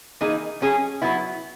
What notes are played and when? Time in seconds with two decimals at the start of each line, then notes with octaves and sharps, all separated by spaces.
0.21 E3 A#3 D#4 G#4
0.61 F#3 C#4 G#4
1.02 F#3 B3 E4